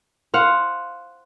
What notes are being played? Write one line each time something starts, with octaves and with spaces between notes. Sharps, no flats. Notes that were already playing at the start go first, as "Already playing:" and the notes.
C5 F5 F#5